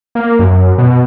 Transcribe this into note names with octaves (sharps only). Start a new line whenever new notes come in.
A#3
F#2
B2